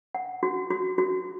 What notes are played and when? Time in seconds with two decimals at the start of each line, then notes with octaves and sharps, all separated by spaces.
0.15 F#5
0.43 F#4
0.71 F#4
0.98 F#4